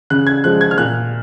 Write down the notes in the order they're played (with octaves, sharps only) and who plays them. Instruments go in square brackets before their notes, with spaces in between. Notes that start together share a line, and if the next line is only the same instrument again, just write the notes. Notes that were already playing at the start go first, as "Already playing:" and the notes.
[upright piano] C#3 F#6
G#6
F3 G#3 F#6
G#6
F6
A#2 F#6